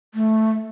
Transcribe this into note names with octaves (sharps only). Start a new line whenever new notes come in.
A3